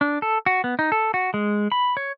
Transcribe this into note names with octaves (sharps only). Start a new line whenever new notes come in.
D4
A4
F#4
B3
D#4
A4
F#4
G#3
B5
C#5